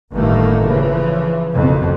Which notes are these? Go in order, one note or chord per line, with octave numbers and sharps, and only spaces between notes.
G1 A2 D#3 A3 A#3
C#3 E3 F3
F#1 B1 F2